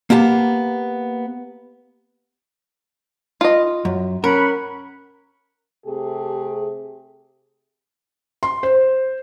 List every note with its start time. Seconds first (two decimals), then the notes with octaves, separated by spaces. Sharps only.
0.10 A#3 B3 G4 A5
3.41 F4 D#5
3.85 F#2
4.24 C#4 A#4 F#5 B5
5.86 C3 A3 G4 G#4
8.43 C6
8.63 C5